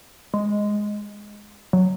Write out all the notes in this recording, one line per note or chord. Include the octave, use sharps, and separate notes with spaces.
G#3
F#3